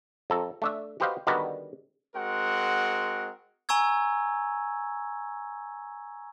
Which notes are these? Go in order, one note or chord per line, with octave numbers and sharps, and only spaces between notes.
F2 A4 A#5
A3 D4 E5
F#4 G4 B4 C5 D#5 F5
D3 D#3 G3 B3 F#4 B4
G#3 C4 F#4 A#4 F#5
G#5 A#5 C#6 E6 G#6